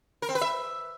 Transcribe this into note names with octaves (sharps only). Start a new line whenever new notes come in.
A#4
C4
B4
E5